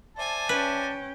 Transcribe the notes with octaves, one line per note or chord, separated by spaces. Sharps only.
C5 D5 E5 G#5 A5
C#4 B4 G5